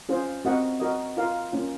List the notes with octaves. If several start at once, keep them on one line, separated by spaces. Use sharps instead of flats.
C#4 F4 G#4 C5
C4 F#4 A#4 D#5 F#5
F#4 A#4 D#5
F4 A#4 F5
A#3 C#4 F4